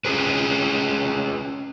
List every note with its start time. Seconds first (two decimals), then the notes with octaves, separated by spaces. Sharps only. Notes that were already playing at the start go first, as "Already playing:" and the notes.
0.05 C#4 F4 G4 G#4 B4